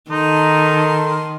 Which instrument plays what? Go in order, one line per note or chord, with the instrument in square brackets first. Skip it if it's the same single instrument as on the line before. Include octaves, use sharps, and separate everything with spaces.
[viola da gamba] D#3 [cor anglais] D#4 [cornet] A4 [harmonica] A#4 C6